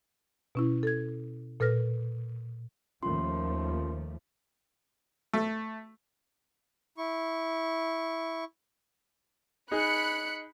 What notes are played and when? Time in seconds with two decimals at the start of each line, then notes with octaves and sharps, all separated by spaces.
0.55 B2 C#4 E4
0.83 A4 G#6
1.60 A#2 A4 B4 F6 A#6
3.03 D#2 F3 A3 C#4 F4 C6
5.33 A3
6.98 E4 C#6
9.71 D#4 G#4 B5 F#6 C#7